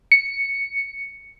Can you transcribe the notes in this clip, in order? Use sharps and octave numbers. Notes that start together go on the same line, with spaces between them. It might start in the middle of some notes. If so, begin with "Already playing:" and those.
C#7